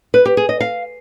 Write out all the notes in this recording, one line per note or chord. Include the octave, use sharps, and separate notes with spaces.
B4
G4
G#4
D#5
F5